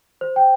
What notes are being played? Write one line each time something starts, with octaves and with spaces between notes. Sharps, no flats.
C5
G5